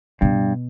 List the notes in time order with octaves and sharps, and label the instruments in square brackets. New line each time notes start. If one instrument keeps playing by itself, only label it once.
[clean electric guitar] G2 [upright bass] B2